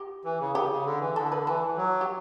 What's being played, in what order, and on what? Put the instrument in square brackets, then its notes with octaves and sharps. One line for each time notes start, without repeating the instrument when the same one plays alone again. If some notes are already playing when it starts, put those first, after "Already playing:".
Already playing: [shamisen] G4
[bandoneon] E3
C#3
[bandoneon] C#3 [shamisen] G4
[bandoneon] C#3
D3
E3
[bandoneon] D3 [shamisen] A4
[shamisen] B4
[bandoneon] E3 [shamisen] A4
[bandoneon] E3
F#3
[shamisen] G4